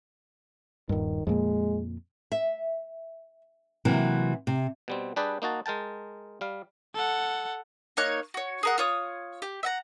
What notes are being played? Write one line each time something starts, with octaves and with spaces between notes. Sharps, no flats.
D#1 G2 D#3
F2 A#2 G#3 A#3
E5
C3 E3 F#3 A#3 C4
C3
B2 G3 C4
G3 D4 G4 G#4 B4 D5
A#3 D#4 F#4 A5
G#3 A#4 G5 A5
G3 F5
A4 F#5
A#3 D#4 C#5 F#6
F#4 C#5
G#4 A#4 F#5
F4 C#5 D#6
G4
E5 F#5 A#5